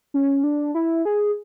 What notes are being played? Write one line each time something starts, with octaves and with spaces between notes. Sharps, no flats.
C#4
D4
E4
G#4